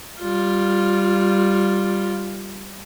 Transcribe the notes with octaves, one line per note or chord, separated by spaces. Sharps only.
G3 F4